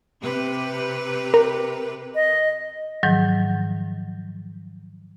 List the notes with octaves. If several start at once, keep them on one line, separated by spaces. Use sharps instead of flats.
C3 G4 B4
A#4
D#5
G#2 D#3 F3 F#3